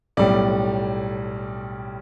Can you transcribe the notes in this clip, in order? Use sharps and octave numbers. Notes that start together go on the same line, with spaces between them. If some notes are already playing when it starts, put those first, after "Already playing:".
B1 A2 G3 D5